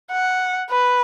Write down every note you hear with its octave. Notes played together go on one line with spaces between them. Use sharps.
F#5
B4